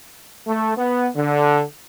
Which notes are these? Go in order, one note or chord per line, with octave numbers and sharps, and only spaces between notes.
A3
B3
D3